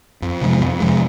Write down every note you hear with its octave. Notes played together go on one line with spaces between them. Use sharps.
F2
C3 F3 G#3
F2
C3 F3 G#3